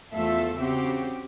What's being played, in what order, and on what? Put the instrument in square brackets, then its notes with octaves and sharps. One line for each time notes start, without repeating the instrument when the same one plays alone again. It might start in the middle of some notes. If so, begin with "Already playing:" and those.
[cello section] E2 F3 A3 F4 A4 E5
C#3 C4 F#4 G4